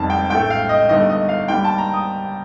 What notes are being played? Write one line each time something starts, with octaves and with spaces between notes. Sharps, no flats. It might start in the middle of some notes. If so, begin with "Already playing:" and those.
Already playing: F1 F2 D#3 G3 A5
G5
A#1 A2 A3 G5
F5
D#5
G1 G2 D#3 A3 D#5
D#5
F5
D#2 D#3 G3 G5
A5
A#5
D#6